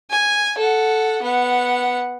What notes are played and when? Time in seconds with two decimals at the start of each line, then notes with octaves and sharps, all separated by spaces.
0.10 G#5
0.58 A4 F#5
1.22 B3 F#5